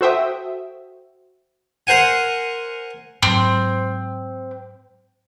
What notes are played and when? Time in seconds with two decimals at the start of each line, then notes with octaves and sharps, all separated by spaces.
0.01 F#4 A4 C5 E5 G5 D#6
1.87 A#4 C5 F#5 G#5
3.23 G#2 F#3 C4